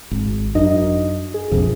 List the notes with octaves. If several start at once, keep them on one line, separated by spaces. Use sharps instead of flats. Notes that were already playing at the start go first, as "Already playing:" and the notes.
G#1
F#2 D4 D#4 D#5
G#4
A#1 F2 C3